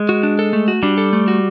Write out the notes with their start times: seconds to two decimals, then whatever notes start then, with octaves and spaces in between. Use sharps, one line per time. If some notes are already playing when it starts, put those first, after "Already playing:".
Already playing: G#3
0.09 F#4
0.23 D4
0.39 A4
0.53 A3
0.68 F#4
0.83 G3 D4
0.98 A4
1.13 A3
1.28 F#4